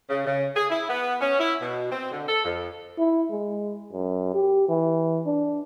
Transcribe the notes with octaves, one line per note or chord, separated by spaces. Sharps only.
C#3
C#3
G#4
E4
B3
C#4
E4
B2
C4
D3
A4
F2
E4
G#3
F#2
G4
E3
D4